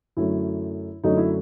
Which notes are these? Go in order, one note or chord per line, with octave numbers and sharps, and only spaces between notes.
F#2 D3 F#3 A3 E4
F#2 D3 F#3 A3 D#4
E4